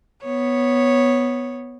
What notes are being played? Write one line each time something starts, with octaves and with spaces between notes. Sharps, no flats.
B3 C#5